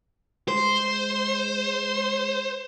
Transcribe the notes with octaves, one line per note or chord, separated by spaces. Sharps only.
G#3 C5